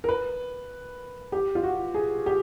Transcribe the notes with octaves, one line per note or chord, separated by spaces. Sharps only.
A#4
B4
G4
F4
F#4
G#4
G4